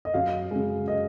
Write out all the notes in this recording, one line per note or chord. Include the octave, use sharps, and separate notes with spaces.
D#5
F#2 F5
C#3 G#3
D#5